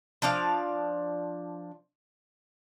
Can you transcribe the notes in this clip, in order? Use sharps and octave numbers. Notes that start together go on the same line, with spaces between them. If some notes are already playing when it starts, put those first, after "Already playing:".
F3 D4 D5 F5